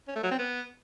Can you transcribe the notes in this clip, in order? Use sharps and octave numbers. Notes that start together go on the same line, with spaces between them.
C#4
A3
F#3
C4
B3